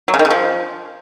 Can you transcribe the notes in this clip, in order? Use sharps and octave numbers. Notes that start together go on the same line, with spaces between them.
F#3
C#3
D#3
C#3
F3